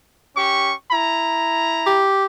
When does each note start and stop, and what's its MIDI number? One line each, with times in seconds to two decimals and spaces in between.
0.36 0.74 61
0.36 0.74 67
0.36 0.74 85
0.92 2.15 64
0.92 2.15 82
1.87 2.26 67